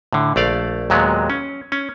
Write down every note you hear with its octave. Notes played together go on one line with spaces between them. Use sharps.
A2 D3
A#1 A3 D5 F5
D#2 A#2 F#3 G#3 B3
C#4
C#4